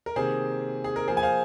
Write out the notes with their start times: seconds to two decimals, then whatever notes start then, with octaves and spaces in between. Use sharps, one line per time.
0.06 A#4
0.16 C3 D#3 A#3 G#4 C5
0.84 G#4
0.96 A#4
1.08 F3 A#3 F4 G#4 C5
1.17 G#5
1.23 C5 F5